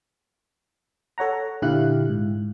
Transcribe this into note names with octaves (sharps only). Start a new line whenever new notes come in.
A4 C#5 F#5 A#5
A#2 D3 E4 G4 F5 F#6
G#2